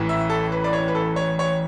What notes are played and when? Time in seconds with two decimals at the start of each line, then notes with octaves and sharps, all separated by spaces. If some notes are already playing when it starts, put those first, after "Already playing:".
Already playing: A1 A2 E3
0.09 E5
0.30 A4
0.52 B4
0.64 D5
0.73 C#5
0.88 B4
0.95 A4
1.16 C#5
1.39 C#5